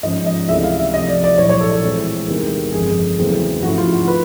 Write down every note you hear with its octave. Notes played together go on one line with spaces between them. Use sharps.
G#2 F3 G#3 C#4 D#5
D#5
C#2 C3 E3 A3 D4 E5
F5
E5
C2 C3 F3 D#5
D5
D5
A#1 A2 F#3 C#5
C#5
A4
A4
A2 E3 G#3 C4
E2 C3 D#3 G#3
G1 F2 C#3 G#4
E2 C#3 F#3 A3 C4
G#2 F3 A3 C#4 E4 F#4
F4
F#4
D#3 B4